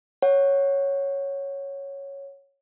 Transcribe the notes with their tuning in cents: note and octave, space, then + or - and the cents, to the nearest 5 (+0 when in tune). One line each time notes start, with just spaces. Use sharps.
C#5 +0 F#5 +0